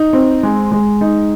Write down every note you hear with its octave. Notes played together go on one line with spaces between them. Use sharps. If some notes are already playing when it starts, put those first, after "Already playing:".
Already playing: D#4
C4
G#3
G#3
D#4